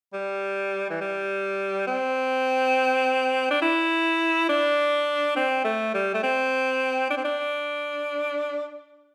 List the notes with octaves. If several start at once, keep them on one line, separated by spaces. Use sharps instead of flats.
G3
E3
G3
C4
D4
E4
D4
C4
A3
G3
A3
C4
D4
C4
D4